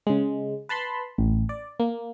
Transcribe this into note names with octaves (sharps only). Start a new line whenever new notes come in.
C#3 G#3
B4 A5 B5 C6
A1
D5
A#3